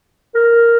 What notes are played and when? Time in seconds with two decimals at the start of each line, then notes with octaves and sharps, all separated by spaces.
0.35 A#4